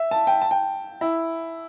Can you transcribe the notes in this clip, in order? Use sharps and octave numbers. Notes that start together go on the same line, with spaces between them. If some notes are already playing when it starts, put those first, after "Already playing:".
Already playing: E5
A5
G5
A5
G5
E4